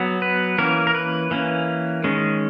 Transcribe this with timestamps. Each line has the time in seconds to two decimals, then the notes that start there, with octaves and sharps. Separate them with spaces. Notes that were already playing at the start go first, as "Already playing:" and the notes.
Already playing: F#3 B3
0.22 B4
0.58 E3 A#3 C#4 A#4
0.87 A#4
0.95 B4
1.31 E3 A#3 C#4
2.04 D#3 G#3 C#4